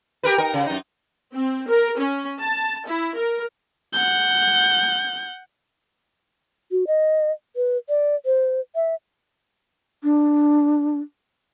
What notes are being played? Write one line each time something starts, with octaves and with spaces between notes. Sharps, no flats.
G4 A#4 B4
D#4 A#4
C#3
F#2 D#4
C4
A#4
C#4
A5
E4
A#4
F#5 G6
F#4
D#5
B4
D5
C5
E5
D4